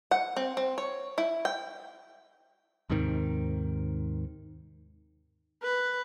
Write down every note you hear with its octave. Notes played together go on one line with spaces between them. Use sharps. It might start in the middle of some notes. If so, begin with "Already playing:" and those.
F#5
C4
C4
C#5
E4
G5
D#2 G#2 C3 D#3
B4